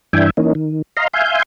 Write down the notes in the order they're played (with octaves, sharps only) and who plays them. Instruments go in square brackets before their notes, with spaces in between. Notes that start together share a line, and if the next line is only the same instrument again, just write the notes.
[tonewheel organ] G2 E3 D4 E5 G5 G#5
E3 A#3 C#4 D#4
D#3
D#5 F5 A#5 C6
E5 F5 G#5 C6 G6